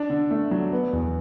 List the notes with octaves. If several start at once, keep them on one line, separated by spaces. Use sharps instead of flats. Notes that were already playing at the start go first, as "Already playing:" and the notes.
Already playing: D4
D3
A3
F#3
B3
E2